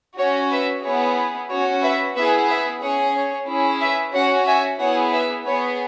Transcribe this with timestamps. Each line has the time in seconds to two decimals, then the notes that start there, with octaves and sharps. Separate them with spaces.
0.18 C#4 F#4 C#5
0.51 B4 E5
0.84 B3 E4 G#4 C#5
1.50 C#4 F#4 C#5
1.83 B4 E5
2.16 B3 E4 G#4 B4 E5
2.49 B4 E5
2.82 C#4 G#4 C#5 F#5
3.15 C#5
3.47 C#4 E4 G#4
3.81 B4 E5
4.14 C#4 F#4 C#5 F#5
4.47 E5 G#5
4.80 B3 E4 G#4 C#5 F#5
5.12 B4 E5
5.45 B3 G#4 C#5